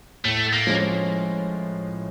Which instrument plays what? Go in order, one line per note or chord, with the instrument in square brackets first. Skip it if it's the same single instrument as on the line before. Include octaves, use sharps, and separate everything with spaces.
[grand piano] A2 [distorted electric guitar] A3
[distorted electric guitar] A#3
[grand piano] F3 G#3 C#4